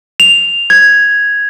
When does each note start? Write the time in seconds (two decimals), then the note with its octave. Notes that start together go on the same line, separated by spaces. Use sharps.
0.20 F7
0.70 G#6